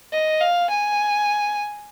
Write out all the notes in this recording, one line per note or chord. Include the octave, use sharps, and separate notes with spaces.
D#5
F5
G#5